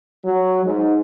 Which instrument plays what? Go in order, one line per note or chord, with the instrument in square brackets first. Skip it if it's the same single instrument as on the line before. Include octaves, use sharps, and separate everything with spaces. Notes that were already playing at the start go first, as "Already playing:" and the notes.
[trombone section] F#3
G#2